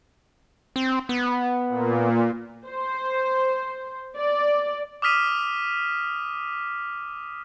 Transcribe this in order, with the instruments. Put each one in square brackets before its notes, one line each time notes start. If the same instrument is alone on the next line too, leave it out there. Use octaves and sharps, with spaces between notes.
[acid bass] C4
B3
[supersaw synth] A#2
[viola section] C5
D5
[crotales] D6 D#6 F6 B6 D#7